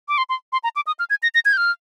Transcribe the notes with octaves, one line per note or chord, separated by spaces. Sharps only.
D6
C6
C6
C6
A#5
D6
D#6
F6
G#6
A#6
A#6
G#6
G6
F6